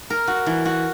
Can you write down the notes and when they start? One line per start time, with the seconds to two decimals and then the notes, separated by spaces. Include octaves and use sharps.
0.10 A#4
0.27 F#4
0.46 E3
0.65 F#4